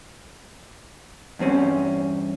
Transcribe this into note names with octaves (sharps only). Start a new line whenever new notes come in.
E2 G2 C4 C#4